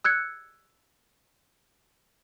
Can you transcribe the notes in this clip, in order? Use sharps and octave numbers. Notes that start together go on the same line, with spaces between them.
E6 F#6 G#6 C#7